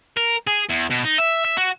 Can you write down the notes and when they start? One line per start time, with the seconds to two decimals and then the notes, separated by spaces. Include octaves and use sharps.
0.17 A#4
0.47 G#4
0.70 E2
0.91 B2
1.05 D#4
1.19 E5
1.45 E5
1.57 F#4